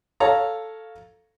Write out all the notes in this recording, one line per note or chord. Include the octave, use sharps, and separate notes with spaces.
A4 C#5 F5 A#5